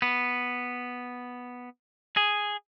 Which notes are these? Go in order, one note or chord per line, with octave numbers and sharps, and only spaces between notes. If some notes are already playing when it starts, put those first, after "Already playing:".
B3
G#4